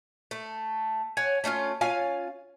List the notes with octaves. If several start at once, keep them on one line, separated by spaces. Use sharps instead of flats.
A3
C#5 F#5 G#5
A3 C#4 D#4 F4
C#4 F4 F5 G#5